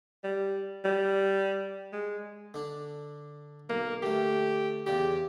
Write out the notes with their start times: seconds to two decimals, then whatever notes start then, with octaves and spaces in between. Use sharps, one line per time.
0.24 G3
0.84 G3
1.93 G#3
2.54 D3 D4
3.70 B1 A#3
4.03 D3 A3 G4
4.86 E2 C#3 G4 D5